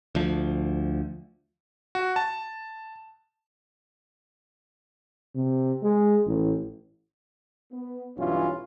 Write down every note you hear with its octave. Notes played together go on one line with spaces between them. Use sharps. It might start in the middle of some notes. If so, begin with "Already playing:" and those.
D2 F3
F#4
A5
C3
G#3
A1
B3
B1 G2 E3 C#4 F4